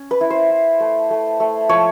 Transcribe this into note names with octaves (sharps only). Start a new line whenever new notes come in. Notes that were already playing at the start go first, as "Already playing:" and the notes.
Already playing: C#4
B4
E4
C5
E4
A3
A3
A3
F3 C#5